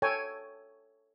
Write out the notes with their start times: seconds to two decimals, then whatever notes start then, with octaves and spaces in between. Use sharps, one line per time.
0.02 A4 C#5 G5 G#5